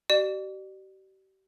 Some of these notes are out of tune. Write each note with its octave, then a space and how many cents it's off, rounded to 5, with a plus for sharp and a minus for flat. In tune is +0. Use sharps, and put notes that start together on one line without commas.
G4 -40 D5 +35